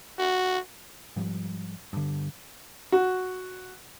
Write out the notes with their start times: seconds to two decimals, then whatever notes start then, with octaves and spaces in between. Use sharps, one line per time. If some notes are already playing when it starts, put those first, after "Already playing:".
0.19 F#4
1.16 G#2 F3 G3
1.93 G2 D3
2.92 F#4